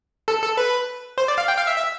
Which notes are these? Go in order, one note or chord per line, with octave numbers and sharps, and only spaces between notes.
A4
A4
B4
C5
D5
F5
G5
F5
E5
E5